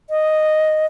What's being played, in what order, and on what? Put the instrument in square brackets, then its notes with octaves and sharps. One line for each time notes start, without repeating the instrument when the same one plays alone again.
[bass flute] D#5